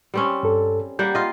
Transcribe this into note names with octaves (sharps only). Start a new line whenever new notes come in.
G3 C4 C#4
G2 A4
G3 A#3 F#5 G6
F4 D#5